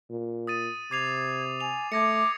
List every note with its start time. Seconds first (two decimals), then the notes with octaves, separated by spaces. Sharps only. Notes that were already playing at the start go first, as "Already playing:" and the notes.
0.10 A#2
0.47 D#6 A6 D#7
0.91 C3 D6 G#6 C7 F7
1.61 G#5 F7
1.92 A3 D6 G#6 A#6 C#7